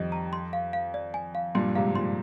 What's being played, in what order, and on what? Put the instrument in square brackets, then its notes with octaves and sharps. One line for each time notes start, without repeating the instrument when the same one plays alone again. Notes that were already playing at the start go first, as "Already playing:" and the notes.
Already playing: [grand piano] F2 D#3 G3 [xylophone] D#5
[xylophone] A#5
C6
F5
F5
D5
G#5
F5
[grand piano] G2 A#2 [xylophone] C6
[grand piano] G#2 C3 [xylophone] F5
[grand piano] G2 A#2 [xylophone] C6